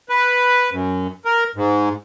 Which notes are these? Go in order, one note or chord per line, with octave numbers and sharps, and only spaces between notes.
B4
F#2
A#4
G#2